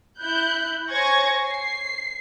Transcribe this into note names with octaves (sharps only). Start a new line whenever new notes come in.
E4 F#6 G6
C5 C#5 G#5 C#6 G#6 A#6
C7